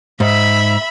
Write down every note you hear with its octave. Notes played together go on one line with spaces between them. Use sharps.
G#2 E5 B5